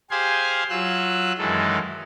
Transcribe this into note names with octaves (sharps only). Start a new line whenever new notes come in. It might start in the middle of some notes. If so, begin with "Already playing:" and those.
G4 G#4 C5 F5 G#5 C6
F#3 F4 E6 F#6
F#2 D#3 E3 G#3 A4